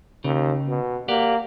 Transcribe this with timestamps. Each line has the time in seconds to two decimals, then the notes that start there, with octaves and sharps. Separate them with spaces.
0.24 D#2 C#3
0.68 B2
1.08 A#3 G4 D5 F#5